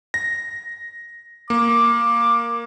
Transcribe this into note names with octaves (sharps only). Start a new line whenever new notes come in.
A#6
A#3 D6